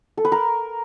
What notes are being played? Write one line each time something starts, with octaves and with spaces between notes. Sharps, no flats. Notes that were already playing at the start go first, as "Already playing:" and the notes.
A4
B4
A#4